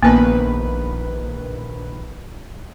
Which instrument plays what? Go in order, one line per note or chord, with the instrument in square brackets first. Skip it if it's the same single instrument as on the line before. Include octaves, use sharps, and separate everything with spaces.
[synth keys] A#1 D#3 B4 [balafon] A#3 B3